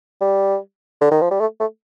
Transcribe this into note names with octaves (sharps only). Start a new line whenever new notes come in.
G3
D3
D#3
F3
G3
A3
A3